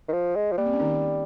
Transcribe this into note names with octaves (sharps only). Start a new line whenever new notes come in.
D#3
F3
G#3
F3
G3 A#3
C4
C#4
D#3 D#4